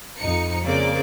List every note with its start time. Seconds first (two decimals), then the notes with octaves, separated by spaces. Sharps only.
0.18 F2 D#4 C#7
0.64 C#3 A#3 C4 D5 D6